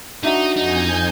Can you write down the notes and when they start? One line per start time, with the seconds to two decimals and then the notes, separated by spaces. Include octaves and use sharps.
0.23 D4 D#4 F#4 E5 A#5
0.56 F2 D#4 G#5 G6